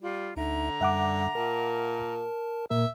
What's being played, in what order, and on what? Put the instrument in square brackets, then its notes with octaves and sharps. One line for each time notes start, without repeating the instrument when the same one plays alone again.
[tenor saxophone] G3 [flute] F4
[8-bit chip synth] D2 D#4 E5 [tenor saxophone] D3 [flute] A#5
[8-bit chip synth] F#2 G3 [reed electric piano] E5 F#5 D6
[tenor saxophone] A#2 [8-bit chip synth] A#4 A5
[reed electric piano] A#2 A#3 A#4 [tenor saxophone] E5